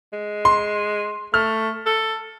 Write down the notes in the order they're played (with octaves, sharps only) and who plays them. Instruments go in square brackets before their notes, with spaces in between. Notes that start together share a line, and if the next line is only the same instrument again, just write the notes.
[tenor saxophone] G#3
[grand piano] C6
[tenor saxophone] A3 [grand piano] F6
[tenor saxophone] A4